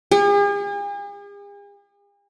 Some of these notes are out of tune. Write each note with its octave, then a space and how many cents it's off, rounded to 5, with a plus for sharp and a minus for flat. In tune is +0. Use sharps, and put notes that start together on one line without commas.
G#4 -45